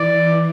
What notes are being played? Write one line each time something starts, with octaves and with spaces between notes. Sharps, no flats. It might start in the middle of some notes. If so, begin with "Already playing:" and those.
Already playing: E3 D5
E3